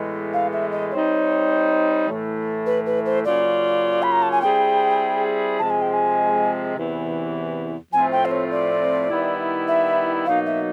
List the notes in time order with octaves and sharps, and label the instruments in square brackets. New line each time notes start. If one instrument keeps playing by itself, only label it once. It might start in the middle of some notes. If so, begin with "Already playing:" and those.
Already playing: [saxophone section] A2 E3 G#3 B3
[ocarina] F5
E5
D#5
[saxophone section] G3 C4 D#4 [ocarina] C#5
[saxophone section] A2 E3 A3
[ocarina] B4
B4
C5
[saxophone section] C#3 F#3 A#3 C#4 F4 [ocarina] D5
[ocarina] B5
A#5
A5
G#5
[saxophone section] G3 C4 E4 G#4 [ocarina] G5
[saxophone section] C3 F3 G#3 [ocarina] A5
[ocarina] G#5
G5
G#5
[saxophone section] E2 C3 E3
[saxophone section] A2 F3 A3 C4 F4 [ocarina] G#5
[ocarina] G5
C5
C#5
D5
[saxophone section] D#3 G3 B3 E4
[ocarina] E5
[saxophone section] B2 F#3 A#3 D#4 [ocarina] F5
[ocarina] E5